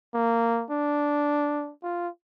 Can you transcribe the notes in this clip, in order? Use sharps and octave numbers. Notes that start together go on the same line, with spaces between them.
A#3
D4
F4